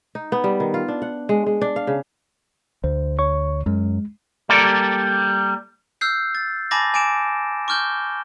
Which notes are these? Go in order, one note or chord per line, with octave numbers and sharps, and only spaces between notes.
D#4
B3
G3
D#3
F4
D4
F#5
G#3
G#3
D4
F5
C#3
D2 C5
C#5 C#6
F#2 G#3
G3 A#3 A4 D5
E6 F6 G6 C7
A6
G#5 A5 B5 D6 A6 A#6
G#5 D6 D7 E7
C#6 D6 F6 G6 G7